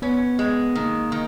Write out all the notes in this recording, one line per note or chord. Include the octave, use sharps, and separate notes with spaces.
B3 C#4
G#3
D#3 A#3
D#3